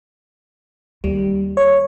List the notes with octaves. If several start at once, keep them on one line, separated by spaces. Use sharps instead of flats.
D#2 G3
C#5